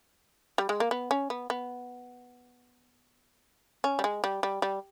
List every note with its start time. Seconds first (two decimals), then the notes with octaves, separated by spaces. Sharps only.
0.58 G3
0.69 G#3
0.80 A#3
0.91 B3
1.11 C#4
1.30 B3
1.50 B3
3.84 C#4
3.99 G3
4.04 G#3
4.24 G3
4.43 G3
4.62 G3